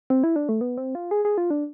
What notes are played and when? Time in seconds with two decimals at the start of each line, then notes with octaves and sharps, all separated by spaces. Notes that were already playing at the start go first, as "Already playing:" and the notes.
0.10 C4
0.24 E4
0.36 D4
0.49 A3
0.61 B3
0.78 C4
0.95 F4
1.11 G#4
1.25 G#4
1.38 F4
1.50 D4